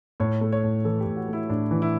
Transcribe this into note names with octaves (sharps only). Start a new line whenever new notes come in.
A2 C#5
A3
C#5
A2
E3 A4
G4
A2
F#4
A3 E4
A2 D4
E3
E4